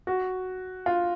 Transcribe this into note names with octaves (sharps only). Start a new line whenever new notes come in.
F#4
F4